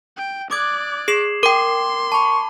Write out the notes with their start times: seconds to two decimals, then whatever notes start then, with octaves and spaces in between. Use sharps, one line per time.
0.18 G5
0.51 D5 D6 D#6 F#6 G#6
1.08 G#4 C7 E7 F#7
1.43 A#4 G5 C6 D6
2.12 A5 B5 C#6